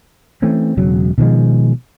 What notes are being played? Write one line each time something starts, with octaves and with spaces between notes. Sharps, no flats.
E3 A3 C4 C#4
E1 C#3 F#3
B2 D#3 F3 G#3